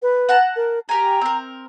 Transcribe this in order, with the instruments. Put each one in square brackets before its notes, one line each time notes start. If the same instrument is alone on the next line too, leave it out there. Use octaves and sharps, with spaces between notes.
[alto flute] B4
[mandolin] F#5 A5 A#5
[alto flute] A#4
[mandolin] G4 A#4 G#5 [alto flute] A#5
[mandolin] C4 A#4